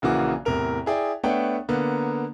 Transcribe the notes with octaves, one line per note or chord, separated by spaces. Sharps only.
A#1 C#3 E3 A#3 F#4 D6
E2 A2 C3 A#4 F7
E4 G#4 D5 G5
A3 B3 D4 C#5 F#5 G5
D3 A#3 B3